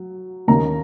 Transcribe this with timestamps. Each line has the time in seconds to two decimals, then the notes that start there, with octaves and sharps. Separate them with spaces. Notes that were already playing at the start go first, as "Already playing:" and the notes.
Already playing: F#3
0.48 D#2 D#3 A#3 C#4 A#5